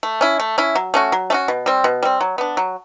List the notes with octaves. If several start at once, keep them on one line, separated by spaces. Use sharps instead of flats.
A3
C#4 E4
A3
C#4 E4
F#3
A3 C#4 F#4
F#3
A3 C#4 F#4
B2
G3 C4
B2
G3 C4
F#3
B3 D4
F#3